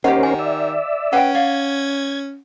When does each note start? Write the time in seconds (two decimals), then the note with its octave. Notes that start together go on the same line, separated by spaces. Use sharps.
0.04 D#2 C#4 G4 A#4 C5 C#5 D#5 F#5
0.23 D#3 G#5
0.39 D5 E5
1.13 C#4 B4 F#5 G5
1.35 D5 F5 G#6